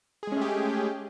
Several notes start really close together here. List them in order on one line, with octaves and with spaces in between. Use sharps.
G#4 G#3 C#4 A3 G4